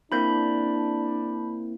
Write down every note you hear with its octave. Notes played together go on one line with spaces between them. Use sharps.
A#3 C4 D4 E4 B5 G6